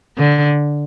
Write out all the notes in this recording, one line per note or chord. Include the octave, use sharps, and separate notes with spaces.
D3